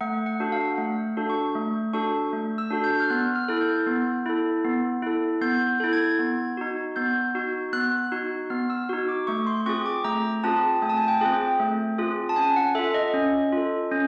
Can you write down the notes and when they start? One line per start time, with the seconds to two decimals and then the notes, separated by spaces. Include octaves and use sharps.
0.01 A3 F#5
0.26 F#5
0.40 D4 F#4 A4
0.52 F5
0.78 A3 F#5
1.17 D4 F#4 A4
1.30 C#6
1.55 A3
1.93 D4 F#4 A4 C#6
2.33 A3
2.58 E6
2.71 D4 F#4 A4
2.84 G6
3.00 F6
3.10 B3 F#6
3.36 F6
3.48 E4 A4
3.61 G6
3.87 B3
4.26 E4 A4
4.64 B3
5.02 E4 A4
5.41 B3 G6
5.67 G6
5.80 E4 A4
5.93 G#6
6.19 B3
6.57 D#4 F#4
6.96 B3 G6
7.35 D#4 F#4
7.73 B3 F#6
8.12 D#4 F#4
8.50 B3 F6
8.70 E6
8.89 D#4 F#4
9.09 D6
9.27 A3 C#6
9.47 C6
9.66 C4 F4 G#4 C#6
9.86 D6
10.04 A3 A#5
10.44 C4 F4 G#4 A5
10.82 A3 G#5
10.89 A5
10.97 G#5
11.08 G5
11.21 C4 F4 G#4
11.33 G5
11.60 A3
11.99 C4 F4 G#4
12.29 A5
12.36 C#4 G#5
12.56 F#5
12.75 F4 A4 E5
12.94 D#5
13.14 C#4
13.52 F4 A4
13.91 C#4